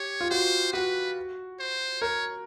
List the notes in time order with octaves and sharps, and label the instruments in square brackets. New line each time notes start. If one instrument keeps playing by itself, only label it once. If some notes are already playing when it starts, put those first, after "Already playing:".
Already playing: [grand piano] G4 [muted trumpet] C#5
[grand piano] F4
[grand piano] F#4 [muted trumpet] C5
[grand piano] F#4 [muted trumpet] B4
[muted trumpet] C5
[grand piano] A#4 [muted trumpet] C#5